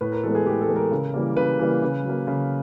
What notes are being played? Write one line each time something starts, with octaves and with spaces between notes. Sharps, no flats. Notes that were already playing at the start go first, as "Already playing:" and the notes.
A2 B4
A#4
E3 G#3 B3 A4
G#4
A2 G4
A4
E3 G#3 B3
A#4
C#3
E3 G3 A#3
C#3 B4
E3 G3 A#3
C#3
F#3
A#3
C#3